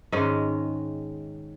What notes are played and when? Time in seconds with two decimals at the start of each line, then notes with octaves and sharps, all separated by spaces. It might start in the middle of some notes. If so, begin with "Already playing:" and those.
0.12 G#2 D#3 G#3 C#4